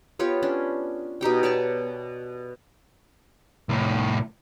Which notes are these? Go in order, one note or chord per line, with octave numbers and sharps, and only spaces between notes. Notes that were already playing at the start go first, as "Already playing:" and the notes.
B3 F4 G4 C#5
C#4 D4
B2 D#4 G4 G5
C#5 D5 A5 C#6
C2 A2